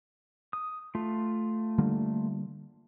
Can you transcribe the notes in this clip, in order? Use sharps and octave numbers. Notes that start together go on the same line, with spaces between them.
D#6
A3 F4
D3 G3 A#3